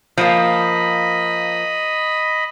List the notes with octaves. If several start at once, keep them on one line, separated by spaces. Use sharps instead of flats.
F3 A#3 D#5 B5